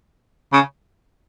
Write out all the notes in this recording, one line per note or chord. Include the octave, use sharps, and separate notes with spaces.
C#3